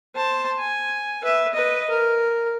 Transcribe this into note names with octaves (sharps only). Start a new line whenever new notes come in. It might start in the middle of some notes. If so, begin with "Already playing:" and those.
C5 A5
G#5
B4 E5
B4 D#5
A#4